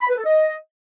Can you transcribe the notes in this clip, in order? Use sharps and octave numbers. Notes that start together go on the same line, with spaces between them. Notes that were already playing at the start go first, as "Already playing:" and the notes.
B5
B4
A4
D#5